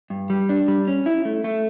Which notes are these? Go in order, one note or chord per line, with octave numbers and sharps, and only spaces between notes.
G2
G3
D4
G3
C#4
E4
A3
A3